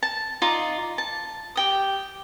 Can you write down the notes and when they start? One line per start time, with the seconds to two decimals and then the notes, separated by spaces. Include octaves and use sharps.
0.03 A5
0.42 D#4 F4 D5
0.98 A5
1.56 G4 G5 D#6